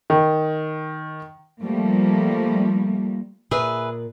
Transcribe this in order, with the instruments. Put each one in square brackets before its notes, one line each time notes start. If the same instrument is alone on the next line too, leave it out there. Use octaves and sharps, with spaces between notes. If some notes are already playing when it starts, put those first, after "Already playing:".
[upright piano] D#3
[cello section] F3 G3 A3 A#3
[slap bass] A#2 [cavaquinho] G#4 B4 E5